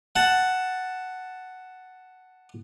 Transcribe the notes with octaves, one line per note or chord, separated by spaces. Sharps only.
F#5 A5